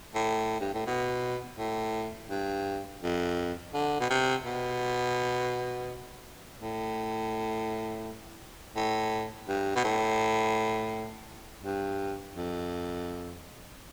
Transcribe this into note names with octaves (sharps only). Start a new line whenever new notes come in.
A2
G2
A2
B2
A2
G2
F2
D3
B2
C3
B2
A2
A2
G2
B2
A2
G2
F2